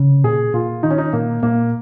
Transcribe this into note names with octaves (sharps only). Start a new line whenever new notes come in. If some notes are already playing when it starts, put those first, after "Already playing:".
Already playing: C#3
A#2 G#4
A#2 F4
D#3 D#4
C#4
D#4
A#2 A#3
A#2 A#3